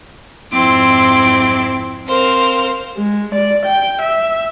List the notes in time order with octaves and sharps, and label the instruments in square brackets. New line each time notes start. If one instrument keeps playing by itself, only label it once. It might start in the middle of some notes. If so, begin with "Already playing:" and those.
[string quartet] F2 G#2 C4 E4 C6 D6
C4 A#4 C5 F5
[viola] G#3
D5
G5
E5